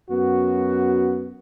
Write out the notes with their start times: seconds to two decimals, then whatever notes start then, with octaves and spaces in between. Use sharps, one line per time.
0.10 F#2 B3 F#4